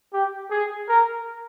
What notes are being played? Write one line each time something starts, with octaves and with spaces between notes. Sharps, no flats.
G4
G#4
A#4